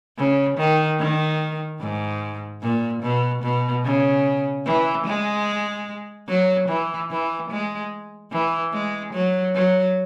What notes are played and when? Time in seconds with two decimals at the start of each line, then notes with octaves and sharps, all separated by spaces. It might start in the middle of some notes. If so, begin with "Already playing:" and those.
0.18 C#3
0.58 D#3
0.99 D#3
1.80 G#2
2.62 A#2
3.03 B2
3.43 B2
3.84 C#3
4.66 E3
5.06 G#3
6.28 F#3
6.68 E3
7.10 E3
7.51 G#3
8.32 E3
8.73 G#3
9.13 F#3
9.55 F#3